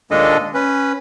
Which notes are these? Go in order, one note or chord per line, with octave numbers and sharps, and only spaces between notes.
D#2 A#2 G#3 D4 A4 D#5
C#4 B4